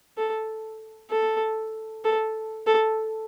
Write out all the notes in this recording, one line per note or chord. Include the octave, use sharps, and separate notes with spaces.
A4
A4
A4
A4